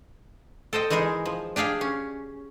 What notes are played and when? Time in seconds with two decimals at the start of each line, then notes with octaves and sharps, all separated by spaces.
0.73 A4 C5 D#5 G5
0.90 E3 G#3 D#4 G#4 A#4
1.25 F3
1.56 D4 G4 G#4 F5 G5
1.81 C#4